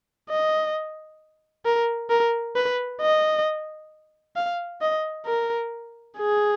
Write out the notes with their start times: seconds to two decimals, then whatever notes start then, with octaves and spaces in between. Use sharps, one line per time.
0.29 D#5
1.65 A#4
2.10 A#4
2.56 B4
3.01 D#5
4.36 F5
4.81 D#5
5.26 A#4
6.18 G#4